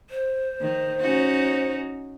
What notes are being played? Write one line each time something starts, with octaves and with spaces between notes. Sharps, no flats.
C5
D#3
C#4 D#4 F#4